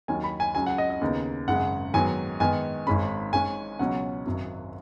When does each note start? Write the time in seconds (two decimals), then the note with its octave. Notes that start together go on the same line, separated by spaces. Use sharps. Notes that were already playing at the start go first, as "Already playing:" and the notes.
0.08 D#2 D#3 F#3 C#4 G#5
0.24 B5
0.40 G#5
0.55 C#2 C#3 F#3 G#5
0.66 F#5
0.78 D#5
0.90 D#5
1.01 D#2 C#3 B3 D#4
1.48 G#1 F#2 C#3 G#3 F#5
1.94 G#2 D#3 F#3 B3 G#5
2.40 G#2 D#3 G#3 B3 G#5
2.87 G#1 G#2 G#3 C#4 B5
3.33 G#2 G#3 C#4 G#5
3.79 C#2 B2 F#3 C#4 F#5
4.26 G#1 F#2 F#3